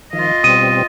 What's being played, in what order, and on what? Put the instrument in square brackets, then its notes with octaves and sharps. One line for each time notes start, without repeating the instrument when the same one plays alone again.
[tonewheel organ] D#3 F3 [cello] F4 D#5
[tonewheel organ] B2 G3 C4 [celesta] D#6 D#7